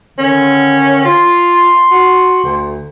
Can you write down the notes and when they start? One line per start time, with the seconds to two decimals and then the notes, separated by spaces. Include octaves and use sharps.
0.19 D3 D#3 C#4
1.05 F4 C6
1.91 F#4
2.44 D2